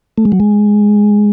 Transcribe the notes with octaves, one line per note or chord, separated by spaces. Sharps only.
A3
G#3
F#3
G#3